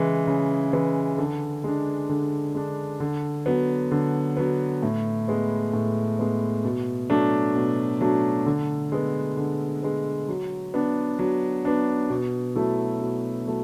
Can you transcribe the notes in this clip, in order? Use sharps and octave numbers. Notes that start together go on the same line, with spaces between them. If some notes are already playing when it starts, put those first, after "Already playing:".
Already playing: C#3 E3 G#3
C#3
E3 G#3
D3
G#3 D4
D3
G#3 D4
D3
F#3 B3
D3
F#3 B3
A2
G#3 B3
A2
G#3 B3
B2
F#3 A3 D4
B2
F#3 A3 D4
D3
G#3 B3
D3
G#3 B3
F#3
B3 D4
F#3
B3 D4
B2
F#3 A3 E4
B2
F#3 A3